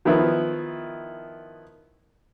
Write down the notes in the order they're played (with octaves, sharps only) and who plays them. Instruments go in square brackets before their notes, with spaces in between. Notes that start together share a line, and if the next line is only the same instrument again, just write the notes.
[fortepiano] D#3 F3 B3 E4